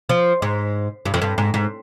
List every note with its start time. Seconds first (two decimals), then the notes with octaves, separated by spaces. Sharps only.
0.09 F3
0.42 G#2
1.05 G2
1.14 F2
1.22 G2
1.38 G#2
1.54 G#2